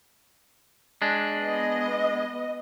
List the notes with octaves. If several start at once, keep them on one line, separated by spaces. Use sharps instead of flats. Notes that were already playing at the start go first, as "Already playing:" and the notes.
G#3 D4
B3 D#5